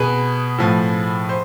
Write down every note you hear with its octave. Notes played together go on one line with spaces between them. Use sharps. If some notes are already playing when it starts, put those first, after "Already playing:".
Already playing: B2 G#4 B4
A2 F3
C5